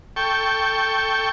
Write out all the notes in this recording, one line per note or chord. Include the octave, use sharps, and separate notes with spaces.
A4 G5 C#6